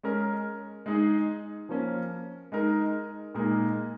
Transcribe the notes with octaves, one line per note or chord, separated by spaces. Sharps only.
G#3 C#4 A#4
G#3 D#4 G#4
F3 A#3 C#4
G#3 D#4 A#4
A#2 G#3 D#4 A#4